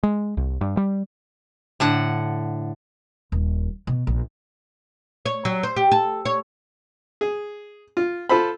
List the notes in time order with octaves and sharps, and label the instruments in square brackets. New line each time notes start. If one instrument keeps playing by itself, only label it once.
[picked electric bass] G#3
C2
G2
G3
[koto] A2 D3 F#5
[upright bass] D#1
B2
A#1
[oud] C#5
F#3
C5
G4
A4
C#5
[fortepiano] G#4
F4
F4 A4 C5 B5